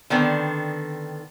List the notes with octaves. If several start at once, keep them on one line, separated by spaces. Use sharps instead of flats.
D3 D#3 B3 C4